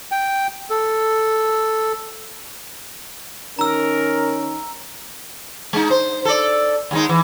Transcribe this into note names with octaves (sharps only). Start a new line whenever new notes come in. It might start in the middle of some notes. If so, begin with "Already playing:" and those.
G5
A4
D#3 C#4 A#4 A#5 E6
G#3 D#4
C5
A4 D5
D#2 G#3 D#4
E3